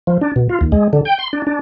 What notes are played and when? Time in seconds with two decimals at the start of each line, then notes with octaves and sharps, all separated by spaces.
0.07 F3
0.21 D4
0.36 B2
0.49 F4
0.61 D#2
0.72 G#3
0.93 D3
1.05 G5
1.19 C6
1.33 D4
1.47 D4